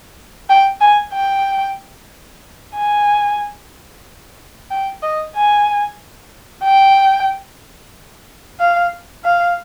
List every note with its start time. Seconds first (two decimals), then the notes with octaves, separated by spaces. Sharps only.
0.50 G5
0.81 G#5
1.14 G5
2.76 G#5
4.71 G5
5.03 D#5
5.36 G#5
6.65 G5
8.60 F5
9.25 F5